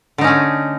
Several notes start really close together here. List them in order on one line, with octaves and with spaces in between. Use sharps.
D3 D#4 C#4 A3